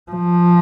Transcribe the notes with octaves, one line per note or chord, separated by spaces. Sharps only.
F3